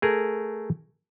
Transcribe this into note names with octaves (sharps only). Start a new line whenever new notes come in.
A3 G#4 A#4